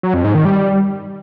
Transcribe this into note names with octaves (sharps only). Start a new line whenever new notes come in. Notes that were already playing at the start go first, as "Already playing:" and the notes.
F#3
F2
G#2
D#3
G3